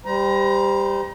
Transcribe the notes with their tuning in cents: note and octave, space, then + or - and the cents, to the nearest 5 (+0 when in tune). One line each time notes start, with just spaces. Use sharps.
G3 +10 C5 -30 A#5 +25